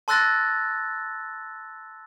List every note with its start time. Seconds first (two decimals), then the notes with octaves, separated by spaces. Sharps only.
0.08 A5 C6 E6 F#6 A6 A#6